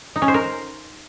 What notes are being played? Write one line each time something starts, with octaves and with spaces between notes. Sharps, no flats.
D#4
C#4
C5
A#4